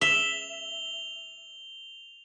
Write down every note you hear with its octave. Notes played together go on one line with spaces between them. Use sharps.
E5 F7 G7